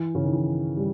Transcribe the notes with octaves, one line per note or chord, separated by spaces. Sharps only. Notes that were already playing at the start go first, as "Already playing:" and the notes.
Already playing: E3
C#3
D#3
E3
G3